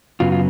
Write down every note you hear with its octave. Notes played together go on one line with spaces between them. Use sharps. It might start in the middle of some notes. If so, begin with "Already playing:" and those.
F#2 C#3 F#3 B3 F4
F4